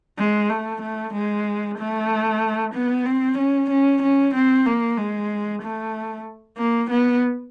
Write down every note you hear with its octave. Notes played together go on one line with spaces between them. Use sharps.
G#3
A3
A3
G#3
A3
B3
C4
C#4
C#4
C#4
C4
A#3
G#3
A3
A#3
B3